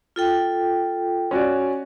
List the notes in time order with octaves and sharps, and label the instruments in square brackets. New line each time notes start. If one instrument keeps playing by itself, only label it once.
[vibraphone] F4 A4 G5
[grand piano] C#4 F#4 D5